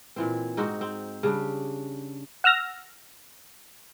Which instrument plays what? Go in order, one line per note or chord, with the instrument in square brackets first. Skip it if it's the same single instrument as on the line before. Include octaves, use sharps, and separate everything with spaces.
[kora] A#2 E3 C4
G#2 C4 D#4 F#4
C4
C#3 G3 D4
[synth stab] F#5 E6 F6 A#6